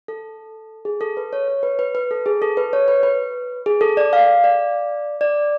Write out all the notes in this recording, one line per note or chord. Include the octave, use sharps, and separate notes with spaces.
A4
G#4
A4
B4
C#5
C#5
B4
B4
B4
A4
G#4
A4
B4
C#5
B4
B4
G#4
A4
D5
F5
D5
D5